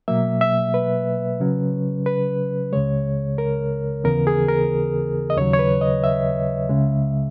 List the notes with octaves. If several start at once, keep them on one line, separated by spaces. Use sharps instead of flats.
B2 F#3 A#3 E5
E5
B4
C#3 F#3 C#4
B4
C#2 C#3 G#3 C#5
A#4
D#2 C#3 E3 B3 A#4
G#4
A#4
D#5
D#2 C#3 F#3 C#5
C#5
B4
D#5
E5
C#2 C#3 G#3